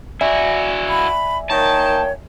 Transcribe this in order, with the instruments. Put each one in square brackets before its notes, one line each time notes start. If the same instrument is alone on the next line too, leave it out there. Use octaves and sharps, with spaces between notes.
[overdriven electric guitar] E4 F#4 [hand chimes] D5 E5 G#5
[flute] B5
[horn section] D#3 A#3 G5 [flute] C#5 [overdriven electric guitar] A5